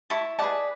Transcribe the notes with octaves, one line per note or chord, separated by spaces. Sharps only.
E4 A5 C#6
G#4 B4 D5 F#5 A5